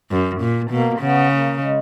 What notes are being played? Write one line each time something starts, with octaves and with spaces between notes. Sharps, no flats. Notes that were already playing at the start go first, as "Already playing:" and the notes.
F#2
A#2
B2 A#3
C#3 B3
A#3
G#3